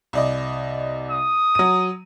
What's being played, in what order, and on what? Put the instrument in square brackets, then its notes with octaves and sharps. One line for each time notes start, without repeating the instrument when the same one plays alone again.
[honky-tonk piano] C2 D5 D#5
[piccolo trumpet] D#6
[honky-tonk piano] F#3 D#7